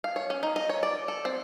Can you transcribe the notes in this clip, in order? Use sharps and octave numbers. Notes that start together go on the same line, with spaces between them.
F5
C#5
C#4
D#4
D#5
C#5
D5
A4
C4